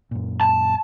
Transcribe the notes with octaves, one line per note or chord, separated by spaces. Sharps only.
F#2 A#2
A5